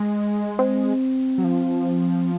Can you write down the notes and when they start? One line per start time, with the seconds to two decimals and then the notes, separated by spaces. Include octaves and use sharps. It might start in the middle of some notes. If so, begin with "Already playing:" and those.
Already playing: G#3
0.59 C4
1.38 F#3
1.44 F3